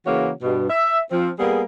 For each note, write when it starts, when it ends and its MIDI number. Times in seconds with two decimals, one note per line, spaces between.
0.06 0.31 49
0.06 0.31 52
0.06 0.31 58
0.06 0.31 66
0.06 0.31 73
0.43 0.67 43
0.43 0.67 47
0.70 0.99 76
1.11 1.30 53
1.11 1.30 60
1.39 1.62 55
1.39 1.62 58
1.39 1.62 59
1.39 1.62 68